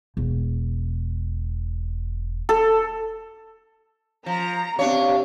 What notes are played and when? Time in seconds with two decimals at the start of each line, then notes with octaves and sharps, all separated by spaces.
0.17 E1
2.49 A4
4.26 F3 A#5
4.79 C3 D4 C#5 F5